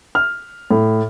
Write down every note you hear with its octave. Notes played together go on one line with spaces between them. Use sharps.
F6
A2